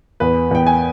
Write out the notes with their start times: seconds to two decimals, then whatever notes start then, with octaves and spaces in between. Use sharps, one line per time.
0.20 E2 B4
0.51 E2 G5
0.67 G#5